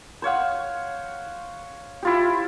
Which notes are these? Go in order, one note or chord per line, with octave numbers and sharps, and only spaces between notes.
C5 C#5 F5 F#5
E4 F4 G4